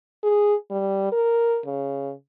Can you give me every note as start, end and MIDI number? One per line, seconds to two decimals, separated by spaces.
0.24 0.55 68
0.71 1.10 55
1.12 1.60 70
1.66 2.13 49